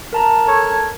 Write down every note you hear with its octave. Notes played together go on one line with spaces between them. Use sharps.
A#4 A5 A#5
A4 C#5